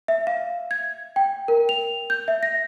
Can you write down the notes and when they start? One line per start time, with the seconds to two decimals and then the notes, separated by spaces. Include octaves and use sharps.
0.08 E5
0.27 F5
0.71 G#6
1.16 G5
1.48 A#4
1.69 F7
2.10 G6
2.28 E5
2.43 A#6